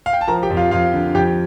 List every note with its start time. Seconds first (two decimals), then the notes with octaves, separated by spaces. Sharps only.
0.06 F5
0.13 G5
0.21 A5
0.28 F3 A#4 A#5
0.43 G4 G5
0.51 F2
0.57 F4 F5
0.71 F2 F4 F5
0.93 D3
1.15 F2 G4 G5